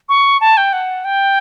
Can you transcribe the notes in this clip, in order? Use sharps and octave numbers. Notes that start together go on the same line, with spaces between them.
C#6
A5
G5
F#5
G5